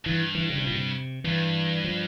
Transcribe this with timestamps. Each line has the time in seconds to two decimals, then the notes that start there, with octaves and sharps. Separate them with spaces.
0.05 G2 E3
0.35 E3
0.50 C#3
0.58 C3
0.67 A#2
0.74 C3
1.24 G2 E3
1.84 F3